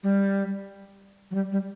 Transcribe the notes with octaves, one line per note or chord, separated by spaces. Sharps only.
G3
F#3
G3
G3